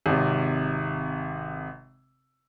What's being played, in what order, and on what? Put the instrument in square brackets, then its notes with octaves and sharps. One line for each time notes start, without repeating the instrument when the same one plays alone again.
[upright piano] G#1 C3